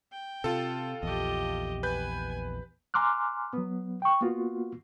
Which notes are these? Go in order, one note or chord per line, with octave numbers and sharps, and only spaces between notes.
G5
C3 F4 A4
A#1 E2 G4 D#5
B4 G#5 G6
G#5 A#5 C6 D6 F6 F#6
F#3 B3
G5 C#6
A#3 B3 F4 F#4